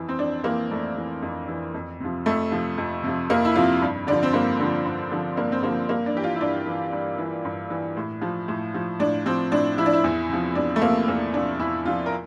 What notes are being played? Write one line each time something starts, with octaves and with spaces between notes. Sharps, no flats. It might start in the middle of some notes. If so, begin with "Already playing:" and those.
Already playing: F2 E3
C4
F2 D4
E3 A#3
F2 A3
E3
F2
E3
F2
C3 F3
F2 A3
C3 F3
F2
C3 F3
F2 A#3
E4
C3 F3 F4
G2
D3 F3 D4
C4
G2 A#3
D3 F3
G2
D3 F3
G2 A#3
C4
D3 F3 A#3
G2 A#3
D4
E3 G4
F4
E4
G2 D4
E3
G2
E3
G2
E3
A2
F3
A2
F3
A2 D4
F3 C4
A2 D4
F3 E4
D4
E4
E2
C3 F3
E2 D4
A3
C3 F3 A#3
E2 A#3
C3 F3 D4
E2 E4
C3 F3 F4
A#4